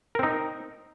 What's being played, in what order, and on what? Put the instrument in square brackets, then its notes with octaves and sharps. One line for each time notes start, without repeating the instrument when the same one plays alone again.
[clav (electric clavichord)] A#4
C4
D#4